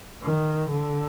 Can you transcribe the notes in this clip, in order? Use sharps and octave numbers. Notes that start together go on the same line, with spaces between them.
D#3
D3